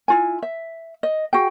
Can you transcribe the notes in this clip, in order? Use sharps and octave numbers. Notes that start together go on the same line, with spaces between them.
E4 F4 G#5
E5
D#5
F#4 G#4 G5